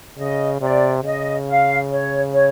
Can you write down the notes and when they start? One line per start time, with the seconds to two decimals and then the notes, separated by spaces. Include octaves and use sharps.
0.18 C#3 D#5
0.61 C3 D5
1.03 C#3 D#5
1.47 F5
1.90 C#5
2.32 C#5